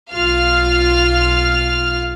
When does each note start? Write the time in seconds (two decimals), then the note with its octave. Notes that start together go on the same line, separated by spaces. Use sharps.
0.10 B1 F4 F5 F6